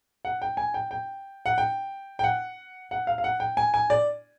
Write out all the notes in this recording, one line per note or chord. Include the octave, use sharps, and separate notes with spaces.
F#5
G5
G#5
G5
G5
F#5
G5
G5
F#5
F#5
F5
F5
F#5
G5
G#5
G#5
D5